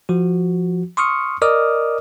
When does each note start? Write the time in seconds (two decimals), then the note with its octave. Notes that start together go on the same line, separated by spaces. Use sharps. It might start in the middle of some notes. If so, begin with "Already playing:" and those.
0.09 F3 F#4
0.97 C6 C#6 D#6 F6 C#7
1.42 A#4 D5 D#5 D6 D#6 F6